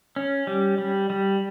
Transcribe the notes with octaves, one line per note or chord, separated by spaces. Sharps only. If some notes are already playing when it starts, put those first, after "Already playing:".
C#4
G3
G3
G3